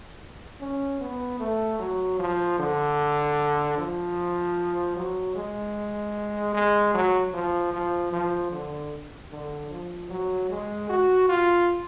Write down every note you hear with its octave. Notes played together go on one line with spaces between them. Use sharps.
C#4
B3
A3
F#3
F3
D3
F3
F#3
G#3
G#3
F#3
F3
F3
F3
D3
D3
F3
F#3
G#3
F#4
F4